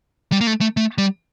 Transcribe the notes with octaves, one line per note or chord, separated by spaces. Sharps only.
G3
A#3
A3
A3
A3
G3